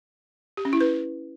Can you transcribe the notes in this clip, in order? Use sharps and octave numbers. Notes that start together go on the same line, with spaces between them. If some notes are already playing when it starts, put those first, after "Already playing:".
G4
C#4
E4
B4